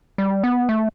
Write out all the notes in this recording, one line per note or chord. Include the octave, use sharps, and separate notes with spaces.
G3
B3
A3